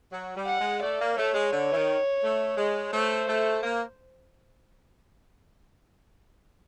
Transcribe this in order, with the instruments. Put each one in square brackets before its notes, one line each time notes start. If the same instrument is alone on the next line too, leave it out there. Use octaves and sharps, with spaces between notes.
[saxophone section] F#3
G3
[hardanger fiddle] F#5
[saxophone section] G#3
[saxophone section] A3 [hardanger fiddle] D5
[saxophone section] A#3
[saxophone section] A3 [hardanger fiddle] C#5
[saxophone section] G#3
D3
E3
D#3
A3
G#3
[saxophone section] A3 [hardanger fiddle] C5
[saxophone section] A3
A#3